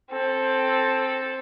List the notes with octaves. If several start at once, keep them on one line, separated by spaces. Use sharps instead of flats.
C4 A4